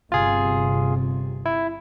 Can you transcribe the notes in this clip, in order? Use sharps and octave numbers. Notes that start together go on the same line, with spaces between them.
G1 C3 F4 G#4
E4